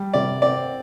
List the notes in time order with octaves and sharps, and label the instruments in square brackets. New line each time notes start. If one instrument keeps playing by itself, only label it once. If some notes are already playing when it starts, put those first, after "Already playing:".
Already playing: [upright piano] G3
[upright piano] C3 [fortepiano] D5
[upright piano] C4 [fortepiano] D5